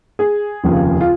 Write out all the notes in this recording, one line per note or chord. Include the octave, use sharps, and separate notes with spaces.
G#4
F1 D#2 C#3 F3
F4